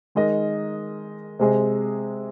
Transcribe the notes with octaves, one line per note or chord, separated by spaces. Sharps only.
D#3 G#3 D#4 A#4 D#5
C3 G#3 C4 G#4 D#5